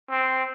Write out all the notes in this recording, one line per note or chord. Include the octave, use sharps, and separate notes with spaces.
C4